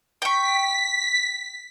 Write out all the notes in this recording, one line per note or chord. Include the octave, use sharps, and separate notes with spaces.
G5 C#6 B6